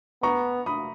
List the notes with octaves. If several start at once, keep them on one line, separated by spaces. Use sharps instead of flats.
B3 A#5 C#6
B5 D#6